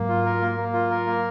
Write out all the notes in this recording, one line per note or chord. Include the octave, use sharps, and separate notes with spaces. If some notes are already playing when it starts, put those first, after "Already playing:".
Already playing: G#2 F#3 A#3
F4
A#4
A#3
A#3
F4
A#4
A#3